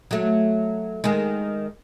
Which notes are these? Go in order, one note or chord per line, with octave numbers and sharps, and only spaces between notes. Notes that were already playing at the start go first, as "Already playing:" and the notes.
F#3 A3
D#3 G#3